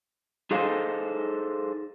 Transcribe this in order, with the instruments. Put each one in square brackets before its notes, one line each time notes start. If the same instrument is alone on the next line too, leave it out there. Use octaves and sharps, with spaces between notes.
[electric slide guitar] D#4 G#4 A4 C5 D#5 F5